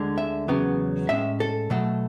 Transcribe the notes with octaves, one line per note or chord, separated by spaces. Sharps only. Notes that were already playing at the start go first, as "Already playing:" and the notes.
Already playing: D2 D3 G#3
E5
E2 C#3 F#3 B3
A2 G#3 C#4 E5
A4
B2 F#3 A3